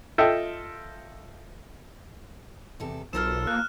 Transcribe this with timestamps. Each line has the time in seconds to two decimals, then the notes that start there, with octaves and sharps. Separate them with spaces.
0.18 F4 A4 D#5 E5 G5
2.80 E2 C3 A4
3.13 B1 F4 A4 A#4 C5 F6 E7
3.47 A#3 F#6